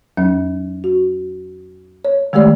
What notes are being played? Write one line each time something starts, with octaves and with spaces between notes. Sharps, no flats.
F2 F#3 C#4
F#4
C#5
D#3 G#3 A3 G4 D5